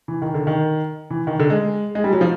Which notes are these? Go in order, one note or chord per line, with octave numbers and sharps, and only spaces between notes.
E3
D#3
D3
D#3
E3
D#3
D3
G#3
G#3
G3
F#3
F3